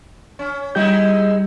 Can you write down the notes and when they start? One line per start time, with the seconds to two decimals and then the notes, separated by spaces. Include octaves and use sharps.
0.39 C#4
0.75 G3 G#3 D#4 E4 G4 G6